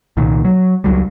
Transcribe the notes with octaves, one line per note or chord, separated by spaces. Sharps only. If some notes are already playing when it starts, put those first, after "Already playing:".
C2 A#2 D#3
F#3
C#2 F#3 G3